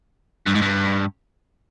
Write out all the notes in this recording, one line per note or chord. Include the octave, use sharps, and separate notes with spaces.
G2
G#2
G2